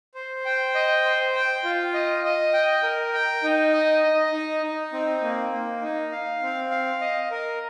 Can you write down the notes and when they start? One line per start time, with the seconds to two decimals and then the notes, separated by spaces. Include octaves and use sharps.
0.15 C5
0.45 G5
0.75 D#5
1.05 C5
1.35 G5
1.64 F4
1.94 D#5
2.24 D#5
2.53 G5
2.83 A#4
3.14 G5
3.43 D#4
3.73 D#5
4.03 D#5
4.32 D#4
4.63 D#4
4.93 C4
5.22 A#3
5.52 A#3
5.82 D#4
6.12 F5
6.42 C4
6.71 F5
7.01 D#5
7.31 A#4